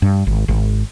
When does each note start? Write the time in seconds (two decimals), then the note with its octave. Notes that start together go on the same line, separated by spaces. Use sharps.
0.02 G2
0.27 G#1
0.48 G#1